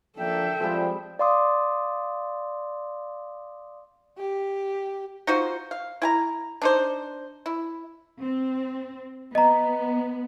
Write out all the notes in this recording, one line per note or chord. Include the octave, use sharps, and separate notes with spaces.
F3 A#3 D4 A4 E5 G5
F3 G3 G#3 C4
D5 F5 C6 D6 D#6
G4
D#4 F4 F#4 C5
F5
E4 G#5 A#5
D4 D#4 C5
E4
C4
B3 D#5 A#5